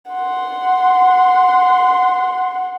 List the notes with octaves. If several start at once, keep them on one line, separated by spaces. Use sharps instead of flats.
F#5 C6